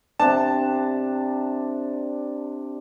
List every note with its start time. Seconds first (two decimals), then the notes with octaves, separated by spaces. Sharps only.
0.20 C3 D4 A5